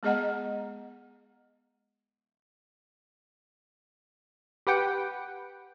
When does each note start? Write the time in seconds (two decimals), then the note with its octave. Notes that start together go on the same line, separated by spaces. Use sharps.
0.03 G#3 B3 G#4 D#5 F#5 A#5
4.67 G4 B4 F#5 G5